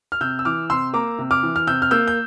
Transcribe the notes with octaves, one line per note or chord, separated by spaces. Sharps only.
F6
C3 E6 G6
E6
E3 D6 F6
C3 C6 E6
A#3 A#5 D6
C3
D6 F6
E3
F6
C3 E6 G6
F6
A#3 E6 G6
G6